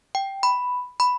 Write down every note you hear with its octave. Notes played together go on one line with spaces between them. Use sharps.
G5
B5
B5